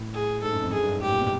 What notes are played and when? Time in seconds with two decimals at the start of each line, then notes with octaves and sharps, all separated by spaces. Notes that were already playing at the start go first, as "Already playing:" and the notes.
Already playing: A2
0.13 G#4
0.42 G#2 A4
0.52 F#2
0.62 F2
0.72 F#2 G#4
0.82 G2
0.92 G#2
1.02 A2 G4
1.12 A#2
1.21 B2